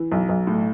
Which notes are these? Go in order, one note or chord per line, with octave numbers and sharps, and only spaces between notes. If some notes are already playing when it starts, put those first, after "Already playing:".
Already playing: E3
B1
B1
A2